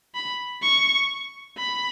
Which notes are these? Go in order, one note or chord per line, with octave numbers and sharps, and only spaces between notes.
B5
C#6
B5